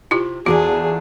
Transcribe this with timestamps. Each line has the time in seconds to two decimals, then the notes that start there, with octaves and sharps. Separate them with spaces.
0.11 C3 E4 F4 G4
0.46 E2 F3 A3 D4 F#4 G#4